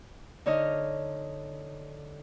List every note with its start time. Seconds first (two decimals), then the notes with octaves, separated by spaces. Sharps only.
0.46 D3 D#4 C#5 D#5 F6